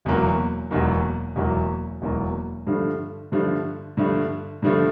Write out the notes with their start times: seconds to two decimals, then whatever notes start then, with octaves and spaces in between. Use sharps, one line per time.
0.05 E1 E2 B2 F#3 A#3
0.71 E1 E2 B2 F#3 A#3
1.36 E1 E2 B2 F#3 A#3
2.02 E1 E2 B2 F#3 A#3
2.67 G2 D3 F3 A3
3.32 G2 D3 F3 A3
3.97 G2 D3 F3 A3
4.62 G2 D3 F3 A3